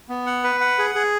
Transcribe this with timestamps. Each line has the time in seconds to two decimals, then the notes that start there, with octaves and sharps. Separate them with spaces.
0.09 B3
0.26 F#5
0.44 B4
0.61 F#5
0.78 G#4
0.95 G#4